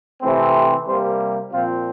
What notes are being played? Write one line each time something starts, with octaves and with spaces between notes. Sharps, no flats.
C3 E3 A3 C4
C3 G3 A#3 C5
A#2 F3 C4 F4